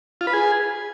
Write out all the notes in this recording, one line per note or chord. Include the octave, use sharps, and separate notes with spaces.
F4
B4
G#4